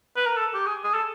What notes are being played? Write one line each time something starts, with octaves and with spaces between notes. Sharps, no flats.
B4
A#4
A4
G4
G#4
G#4
A4